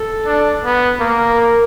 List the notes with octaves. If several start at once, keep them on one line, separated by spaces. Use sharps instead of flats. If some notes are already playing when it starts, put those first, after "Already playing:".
Already playing: A4
D4
B3
A#3 A#4